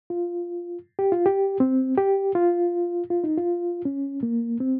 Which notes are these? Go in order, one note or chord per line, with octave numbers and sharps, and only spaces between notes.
F4
G4
F4
G4
C4
G4
F4
F4
D#4
F4
C#4
A#3
C4